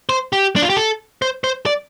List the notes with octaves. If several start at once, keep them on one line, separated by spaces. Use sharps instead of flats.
C5
G4
D4
F4
G4
A4
C5
C5
D5